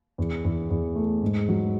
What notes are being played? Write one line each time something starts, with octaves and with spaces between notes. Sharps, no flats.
E2
E2
E2
A3
G#2
F#3